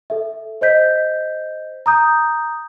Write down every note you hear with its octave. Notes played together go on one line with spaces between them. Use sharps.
A4 E5
C5 D#5 G6 B6
A#5 D#6 G6